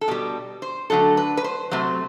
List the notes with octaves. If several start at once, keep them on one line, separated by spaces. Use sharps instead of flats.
A4
B2 G3 G4
C5
D3 F#3 A3 A4
B4
B4
C5
C3 F#3 A3 C5